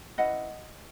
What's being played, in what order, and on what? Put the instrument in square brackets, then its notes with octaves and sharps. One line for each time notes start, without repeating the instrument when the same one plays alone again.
[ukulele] C#4 E4 B4 D#5 F#5